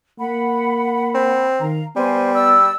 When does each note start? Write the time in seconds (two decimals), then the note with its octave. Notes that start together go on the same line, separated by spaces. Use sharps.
0.19 A#3 F#5 B5
1.14 C4
1.60 D#3 F5 A#5
1.96 G3 B3 C5 G#5
2.34 D5 E6